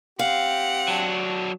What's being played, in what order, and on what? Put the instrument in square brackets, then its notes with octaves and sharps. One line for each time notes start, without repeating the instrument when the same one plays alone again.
[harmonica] C4 G4 [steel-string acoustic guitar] F5 [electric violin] F#5
[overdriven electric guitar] F#3 D4